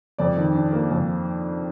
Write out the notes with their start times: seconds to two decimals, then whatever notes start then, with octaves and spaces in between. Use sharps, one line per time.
0.18 F2 D5
0.37 D#3
0.55 D4
0.73 A#3
0.91 F2